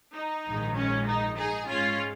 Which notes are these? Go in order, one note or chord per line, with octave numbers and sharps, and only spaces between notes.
D#4
A#1 G#2 D#3 G#3
C#4
D#4
D#4 G#4
G#2 G#3 C#4 F4